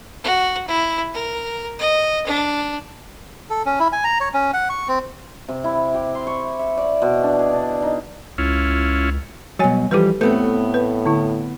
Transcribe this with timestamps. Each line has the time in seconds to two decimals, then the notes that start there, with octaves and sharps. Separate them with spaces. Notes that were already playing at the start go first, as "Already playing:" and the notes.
0.24 F#4
0.68 E4
1.14 A#4
1.79 D#5
2.27 D4
3.50 A4
3.66 C#4
3.80 E4
3.93 G#5
4.04 A#5
4.21 C#5
4.34 C#4
4.53 F#5
4.70 C#6
4.88 C4
5.49 C3
5.64 E4
5.94 G4
6.15 C6
6.27 C#6
6.59 E5
6.77 D5
7.02 B2
7.23 D4
7.39 G#4
7.53 D4
7.82 D#4
8.38 C#2 C#4 E4 F4
9.59 B2 F#3 G3 C#5 G#5
9.91 E3 F3 G3 G4 A4 B4
10.21 A2 A3 B3 C4 B4
10.74 B4
11.06 D3 E4